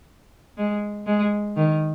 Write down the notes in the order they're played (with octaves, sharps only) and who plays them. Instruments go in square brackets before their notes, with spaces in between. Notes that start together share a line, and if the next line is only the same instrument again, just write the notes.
[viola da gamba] G#3
G#3
D#3